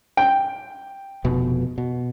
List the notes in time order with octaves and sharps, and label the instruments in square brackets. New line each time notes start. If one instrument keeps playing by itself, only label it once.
[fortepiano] G5
[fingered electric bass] F1 B2 B3
B2